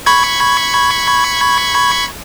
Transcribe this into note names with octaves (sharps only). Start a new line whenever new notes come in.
B5 C#6 G#6